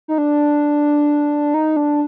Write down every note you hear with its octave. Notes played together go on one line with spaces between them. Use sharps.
D#4
D4
D#4
D4